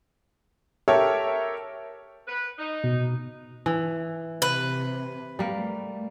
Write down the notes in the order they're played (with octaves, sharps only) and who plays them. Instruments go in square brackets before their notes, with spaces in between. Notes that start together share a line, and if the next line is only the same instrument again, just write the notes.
[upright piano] G4 A4 A#4 C#5 E5
[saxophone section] B4
D#4
[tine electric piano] B2
[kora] E3
[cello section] C3 [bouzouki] B4
[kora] G3 A#3 [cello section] A3